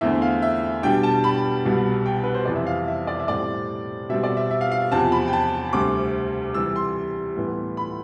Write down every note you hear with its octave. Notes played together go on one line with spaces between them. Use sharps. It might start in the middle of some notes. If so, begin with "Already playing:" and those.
E2 D3 A3 C4 E5
F5
E5
B2 G3 D4 G5
A5
B5
C2 B2 G3
G5
B4
C5
F2 C3 E3 D5
E5
F5
E5
D5
E5
A2 G3 C4 D5
B2 G3 C4 E5
D5
E5
E5
F5
F5
E2 C3 F3 C4 A5
B5
G5
A5
D2 C3 G3 C4 D6
C3 E3 G3 E6
C6
A2 E3 G3 B3
B5